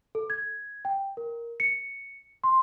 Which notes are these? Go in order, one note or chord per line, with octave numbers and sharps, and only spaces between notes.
A4
G#6
G5
A#4
C#7
C6